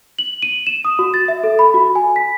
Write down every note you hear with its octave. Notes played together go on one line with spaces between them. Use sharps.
F#7
D#7
E7
D#6
F#4
A6
E5
A4
B5
F#4
G#5
B6